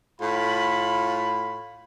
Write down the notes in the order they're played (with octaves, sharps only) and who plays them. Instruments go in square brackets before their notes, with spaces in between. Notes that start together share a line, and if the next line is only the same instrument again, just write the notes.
[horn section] A2 F4 B5